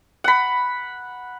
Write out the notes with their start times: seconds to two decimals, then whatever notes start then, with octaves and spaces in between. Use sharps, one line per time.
0.24 F#5 B5